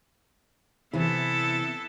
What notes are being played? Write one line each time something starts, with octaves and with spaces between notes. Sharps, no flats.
C3 E3 B3 E4 A4 B4